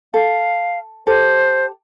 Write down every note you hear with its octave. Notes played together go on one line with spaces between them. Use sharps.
A4 F5
G4 A4 C5